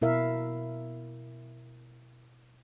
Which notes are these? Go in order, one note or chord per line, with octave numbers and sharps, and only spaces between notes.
B2 E4 A#4 E5 F5